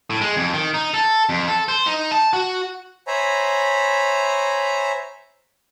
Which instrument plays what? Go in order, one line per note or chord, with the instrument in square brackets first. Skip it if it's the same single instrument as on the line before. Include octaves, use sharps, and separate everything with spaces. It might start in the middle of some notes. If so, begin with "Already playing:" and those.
[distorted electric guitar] A2
G#3
F2
D#3
D#4
A4
F2
A4
C5
D#4
A5
F#4
[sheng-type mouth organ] C5 C#5 E5 G#5 A#5 B5